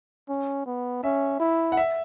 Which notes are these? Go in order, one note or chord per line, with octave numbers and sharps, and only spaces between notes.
C#4
B3
C#4 E5
E4
F#5
E5